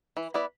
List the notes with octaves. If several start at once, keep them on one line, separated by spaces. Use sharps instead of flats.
E3
B3 E4 B4 D5